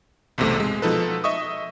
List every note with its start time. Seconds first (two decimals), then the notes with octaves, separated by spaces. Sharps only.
0.38 B1 E2 G#2 C3 A3
0.60 G#3
0.82 B2 F3 D#4 A4 B4
1.24 D#5 E5 C#6 D#6